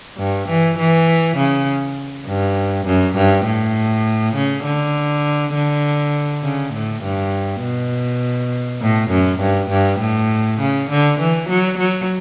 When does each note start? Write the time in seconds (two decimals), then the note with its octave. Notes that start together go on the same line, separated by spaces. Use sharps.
0.18 G2
0.49 E3
0.79 E3
1.37 C#3
2.27 G2
2.87 F#2
3.16 G2
3.45 A2
4.35 C#3
4.65 D3
5.55 D3
6.43 C#3
6.73 A2
7.03 G2
7.62 B2
8.81 A2
9.11 F#2
9.40 G2
9.70 G2
10.00 A2
10.60 C#3
10.90 D3
11.20 E3
11.49 F#3
11.78 F#3